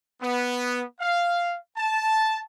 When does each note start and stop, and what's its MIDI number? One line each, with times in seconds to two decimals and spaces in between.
0.21 0.82 59
1.00 1.56 77
1.77 2.41 81